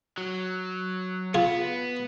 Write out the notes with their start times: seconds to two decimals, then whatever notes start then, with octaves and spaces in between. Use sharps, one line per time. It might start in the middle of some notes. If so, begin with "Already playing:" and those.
0.18 F#3
1.34 B3 F4 G#4